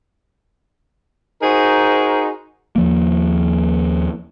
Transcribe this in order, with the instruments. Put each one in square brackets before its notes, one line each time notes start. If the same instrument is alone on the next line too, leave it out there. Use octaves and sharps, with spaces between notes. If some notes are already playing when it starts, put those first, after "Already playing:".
[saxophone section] D#4 F#4 G#4 A#4 C5
[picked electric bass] D#2 F3 A#3